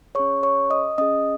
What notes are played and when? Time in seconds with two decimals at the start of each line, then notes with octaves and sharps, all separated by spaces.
0.15 C#4 G#4 C#5 C#6
0.43 C#5 C#6
0.70 D#5 D#6
0.98 C#4 G#4 D#5 D#6